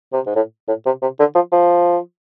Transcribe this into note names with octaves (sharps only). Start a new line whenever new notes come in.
C3
G#2
A2
A2
C3
C3
D3
F3
F3